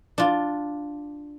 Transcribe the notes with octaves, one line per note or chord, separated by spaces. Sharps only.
D4 F4